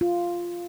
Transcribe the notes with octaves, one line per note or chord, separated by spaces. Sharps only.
F4